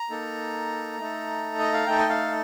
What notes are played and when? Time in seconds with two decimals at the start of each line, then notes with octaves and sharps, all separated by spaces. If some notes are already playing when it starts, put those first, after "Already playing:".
Already playing: A#5
0.10 A#3 D#4 A4
0.99 A3 D#4 A4
1.59 D#5
1.73 F5
1.87 A3 D#4 A4 G5
1.98 D#5
2.09 F5